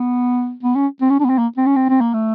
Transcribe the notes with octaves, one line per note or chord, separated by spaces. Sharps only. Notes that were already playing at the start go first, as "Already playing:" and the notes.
Already playing: B3
B3
C#4
C4
C#4
D4
B3
C4
A#3
C4
C#4
C4
C4
A#3
A3